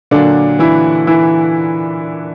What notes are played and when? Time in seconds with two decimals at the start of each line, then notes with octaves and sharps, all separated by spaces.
0.11 A#2 D3 F#3 A#3 D4
0.59 E3 E4
1.07 E3 E4